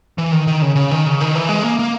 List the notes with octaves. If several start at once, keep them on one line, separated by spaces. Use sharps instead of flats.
E3
D#3
D#3
C#3
C#3
D#3
C#3
D#3
E3
G#3
A#3
A#3